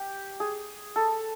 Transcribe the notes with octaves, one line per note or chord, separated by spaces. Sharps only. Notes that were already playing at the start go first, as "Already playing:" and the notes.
Already playing: G4
G#4
A4